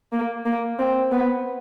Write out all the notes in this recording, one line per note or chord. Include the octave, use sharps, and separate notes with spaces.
A#3
A#3
C4
B3